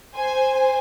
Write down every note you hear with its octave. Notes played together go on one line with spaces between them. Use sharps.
C5 G#5